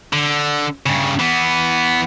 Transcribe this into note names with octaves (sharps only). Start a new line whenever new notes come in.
D3
G2 C#3
E3 B3